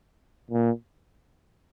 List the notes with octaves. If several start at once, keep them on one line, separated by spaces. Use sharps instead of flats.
A#2